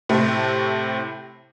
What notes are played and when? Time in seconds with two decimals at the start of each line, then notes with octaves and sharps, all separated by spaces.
0.09 A2 C3 A3